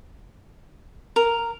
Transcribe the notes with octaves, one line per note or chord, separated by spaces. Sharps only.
A#4